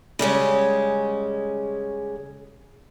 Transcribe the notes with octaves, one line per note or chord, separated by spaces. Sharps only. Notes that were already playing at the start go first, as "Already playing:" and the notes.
C#3 G3 G#3 C#4